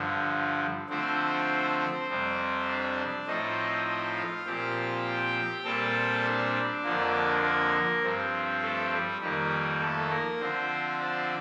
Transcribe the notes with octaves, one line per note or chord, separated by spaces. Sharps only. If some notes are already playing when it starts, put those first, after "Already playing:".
Already playing: G2 D3 F3
D3 F3 A3 C4 C5
F2 C3 G3 C4
D4 D5
A2 F3 A3 C4 D#4 D#5
D#4 D#5
F4 F5
A#2 F3 C4 G4 G5
A#2 G3 C4 A4 A5
D4 D5
F2 D3 F3 A#3
A#3 A#4
G2 F3 C4
A3 A4
G3 G4
F2 D#3 G3 A#3 G4
A3 A4
A#3 A#4
D3 F3 C4 C5
D4 D5